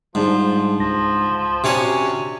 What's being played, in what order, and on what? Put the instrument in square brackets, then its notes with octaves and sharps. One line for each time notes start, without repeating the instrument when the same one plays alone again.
[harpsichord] G#2 [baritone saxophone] F3 [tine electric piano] G3 D4 G#4
[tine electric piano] C#2 A#6 [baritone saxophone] F3
[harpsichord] C3 D4 C#5 [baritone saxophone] C#4 [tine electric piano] F#4